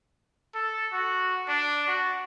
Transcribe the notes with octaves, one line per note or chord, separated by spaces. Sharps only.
A4
F#4
D4
F#4